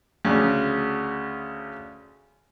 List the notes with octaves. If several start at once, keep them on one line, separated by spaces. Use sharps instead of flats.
D2 C#3